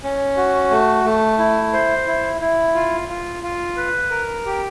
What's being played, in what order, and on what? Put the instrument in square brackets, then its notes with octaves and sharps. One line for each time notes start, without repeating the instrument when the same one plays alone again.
[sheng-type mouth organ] C#4
F#4
A3
A3
E4
C5
E4
E4
F4
F4
F4
B4
A#4
G4